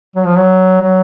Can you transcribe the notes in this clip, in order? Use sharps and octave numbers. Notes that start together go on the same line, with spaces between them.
F#3
F3
F#3
F#3